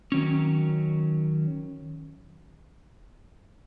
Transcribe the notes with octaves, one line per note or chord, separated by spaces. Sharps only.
D#3 F#3 C#4